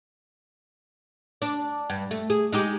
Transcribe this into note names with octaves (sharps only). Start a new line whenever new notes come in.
D4
G2
A3
G#4
G#3 D#4 G4